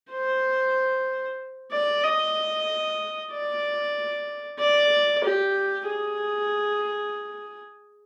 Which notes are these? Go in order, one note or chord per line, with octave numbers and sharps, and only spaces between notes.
C5
D5
D#5
D5
D5
G4
G#4